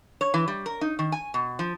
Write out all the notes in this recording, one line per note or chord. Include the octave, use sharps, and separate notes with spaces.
C#5
E3
G3
A#4
D#4
D#3
G#5
B2
F3